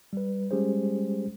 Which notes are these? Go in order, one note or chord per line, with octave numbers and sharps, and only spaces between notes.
G3 B4
G3 G#3 C#4 G4 G#4 C5